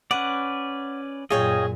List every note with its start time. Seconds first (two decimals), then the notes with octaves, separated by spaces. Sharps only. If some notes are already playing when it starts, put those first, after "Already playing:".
0.11 C#4 B4 D5 F#5
1.30 F#2 A#2 F4 G#4 C#5 D#5 G5